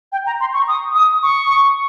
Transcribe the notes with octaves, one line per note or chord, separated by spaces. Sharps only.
G5
A#5
C6
C#6
D#6
D#6
C#6